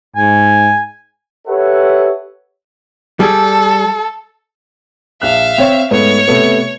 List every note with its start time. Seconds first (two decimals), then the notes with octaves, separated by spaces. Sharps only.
0.16 G#2 G#5
1.48 G4 A4 B4 C#5 E5 F#5
3.20 G3 G#4 A4
5.22 A#1 E5 F5 F#6
5.58 C4 C#5
5.91 G#2 A3 B3 C#5
6.28 C3 A3 B3